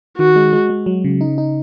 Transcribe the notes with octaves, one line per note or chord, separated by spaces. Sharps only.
D#3 F#4
G#3
G#3
G#3
F#3
C#3
D#4
D#4